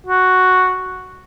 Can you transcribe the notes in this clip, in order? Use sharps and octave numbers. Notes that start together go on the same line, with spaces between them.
F#4